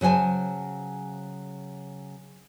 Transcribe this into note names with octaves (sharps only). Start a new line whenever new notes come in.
C#3 F#3 C5 G#5 A5